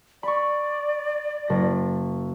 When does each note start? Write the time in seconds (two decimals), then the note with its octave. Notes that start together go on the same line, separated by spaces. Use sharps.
0.23 D5 B5 C#6
1.48 F#1 A#6